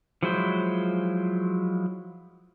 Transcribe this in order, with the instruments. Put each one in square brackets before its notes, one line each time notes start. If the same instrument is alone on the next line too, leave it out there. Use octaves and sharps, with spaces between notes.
[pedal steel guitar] F3 F#3 G#3 E4 C5